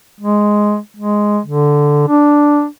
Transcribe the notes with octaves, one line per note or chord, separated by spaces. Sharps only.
G#3
G#3
D3
D4